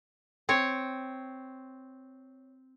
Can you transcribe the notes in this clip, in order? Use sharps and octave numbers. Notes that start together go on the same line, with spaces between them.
C4 C#5